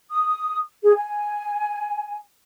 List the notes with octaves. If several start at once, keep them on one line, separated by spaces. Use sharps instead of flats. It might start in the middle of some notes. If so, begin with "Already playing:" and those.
D#6
G#4
G#5